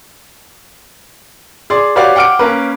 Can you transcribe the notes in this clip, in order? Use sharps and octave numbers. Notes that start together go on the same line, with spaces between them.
G#4 D5 C6
F#4 G4 B4 C#5 D5 F5
F#5 G5 D6 F6 C#7 D7
A#3 C#4 A#4 B4